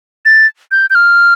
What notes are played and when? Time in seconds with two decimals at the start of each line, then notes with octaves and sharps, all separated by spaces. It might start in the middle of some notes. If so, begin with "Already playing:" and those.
0.25 A6
0.71 G6
0.90 G6
0.95 F6